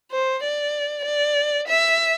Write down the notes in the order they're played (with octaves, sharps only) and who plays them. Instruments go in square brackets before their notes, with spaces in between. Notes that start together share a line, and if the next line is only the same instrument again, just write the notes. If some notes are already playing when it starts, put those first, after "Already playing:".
[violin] C5
D5
D5
E5